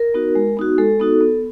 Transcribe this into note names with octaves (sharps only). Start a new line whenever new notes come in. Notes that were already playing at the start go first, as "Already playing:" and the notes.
Already playing: A#4
B3 D#4 F#4
G#3
B3 D#4 F#4
G#3 A4
B3 D#4 F#4
B3